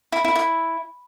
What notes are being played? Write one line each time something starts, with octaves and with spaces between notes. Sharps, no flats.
E4
E4
E4